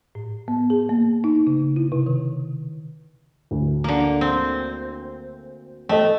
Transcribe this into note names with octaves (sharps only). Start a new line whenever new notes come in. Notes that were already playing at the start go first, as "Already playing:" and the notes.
A2
B3
G#4
A#3
D#4
C#3
E4
C3
D#3
D2
D3 A#3
C4
A3 A4 D#5 G5